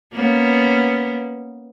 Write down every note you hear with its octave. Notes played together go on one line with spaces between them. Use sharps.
A#3 B3 C#4